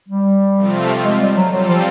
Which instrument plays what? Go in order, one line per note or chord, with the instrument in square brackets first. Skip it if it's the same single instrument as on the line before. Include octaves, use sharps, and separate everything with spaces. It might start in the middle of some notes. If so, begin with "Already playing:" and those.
[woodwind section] G3
[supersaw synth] C3 F3 A3 C4 F4
[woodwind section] G#3
G3
F#3
[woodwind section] F#3 [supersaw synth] G3 C4 F4 A4
[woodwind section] F3